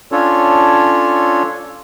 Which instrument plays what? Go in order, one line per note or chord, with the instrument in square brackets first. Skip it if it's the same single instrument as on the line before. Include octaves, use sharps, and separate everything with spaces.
[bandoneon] C#4 D4 F4 A4 C#5